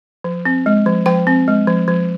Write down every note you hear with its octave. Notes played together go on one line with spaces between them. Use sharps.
F3
C4
G#3
F3
F3 G5
C4
G#3
F3
F3